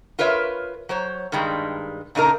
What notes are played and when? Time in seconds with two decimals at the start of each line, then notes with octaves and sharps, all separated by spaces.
0.19 F4 A#4 B4 C#5 E5
0.89 F#3 C5 C#5
1.32 G2 D#3 G3 G#3
2.15 A#2 C#3 D4 D#4 A4 A#4